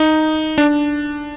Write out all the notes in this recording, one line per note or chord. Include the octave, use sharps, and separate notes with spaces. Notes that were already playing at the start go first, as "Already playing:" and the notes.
Already playing: D#4
D4